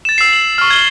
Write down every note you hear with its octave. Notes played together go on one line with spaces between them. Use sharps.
A6 E7
E6 C7
F#7
C#6 F6
G#6 G7